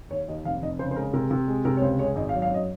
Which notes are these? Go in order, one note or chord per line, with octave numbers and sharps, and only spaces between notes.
D#2 C#5
D#2 D#5
F1 F5
F1 D#5
C#3 C5
C5
G#3 A#4
C3 A#4
C3
G#3
C3 A#4
C#5
C#2 C5
G#3 C#5
G#1 D#5
F5
F#3
F5
F#2 D#5